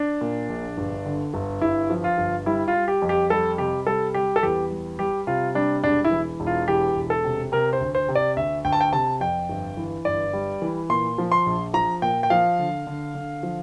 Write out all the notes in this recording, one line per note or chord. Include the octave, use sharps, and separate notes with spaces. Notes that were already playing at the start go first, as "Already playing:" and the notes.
Already playing: D4
A#2
A#1
G1
D3
G1
G1 E4
F3
F4
G1
G3 E4
F4
G3
G4
F2
G4
G3 A4
C3 G4
G3 A4
G3 G4
A4
E2 G4
G3
G3 G4
C3 F4
G3 D4
E1 D4
E4
E3
E1
F4
E3 G4
E1
A4
C3
C3 A#4
C5
D2
C5
C3
D5
D2 E5
D2 G5
A5
G5
C3 A5
F2 G5
G1
E3
G1 D5
G3
E3
A#2 C6
F3
C6
A#1
F3 A#5
A#2 G5
G5
F3 F5
D3
D3
D3
F3